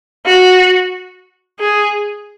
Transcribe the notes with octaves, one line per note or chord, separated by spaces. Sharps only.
F#4
G#4